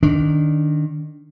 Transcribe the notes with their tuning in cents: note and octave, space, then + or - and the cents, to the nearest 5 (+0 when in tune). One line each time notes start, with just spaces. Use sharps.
D#3 -20 D4 -15